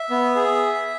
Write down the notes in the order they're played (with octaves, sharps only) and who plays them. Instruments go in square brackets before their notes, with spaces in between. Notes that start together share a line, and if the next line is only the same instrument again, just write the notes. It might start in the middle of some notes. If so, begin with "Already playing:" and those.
Already playing: [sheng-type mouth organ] E5
B3
G#4